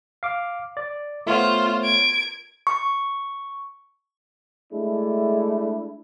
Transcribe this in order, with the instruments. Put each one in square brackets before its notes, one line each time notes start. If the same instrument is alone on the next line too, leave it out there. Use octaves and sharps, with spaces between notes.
[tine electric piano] F5 D6
D5
[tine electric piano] A3 B3 C#5 [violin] F4 C5
[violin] G#6 D7
[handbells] C#6
[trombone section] G#3 A3 D4 E4